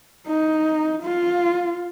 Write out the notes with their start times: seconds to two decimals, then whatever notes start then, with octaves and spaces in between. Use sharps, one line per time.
0.27 D#4
1.03 F4